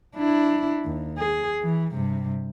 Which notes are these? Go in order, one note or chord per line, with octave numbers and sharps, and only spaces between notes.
D4 E4
D#2
G#4
E3
G2 C3